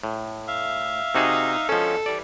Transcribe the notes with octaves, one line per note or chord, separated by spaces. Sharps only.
A2
E5 F5
C3 D#4 F#4 G#4
B2 D3 F3 G#3 C#4 A4
E3 G3 D5